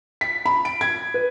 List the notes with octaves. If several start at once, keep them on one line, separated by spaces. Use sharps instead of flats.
B6
B5
D7
G#6
B4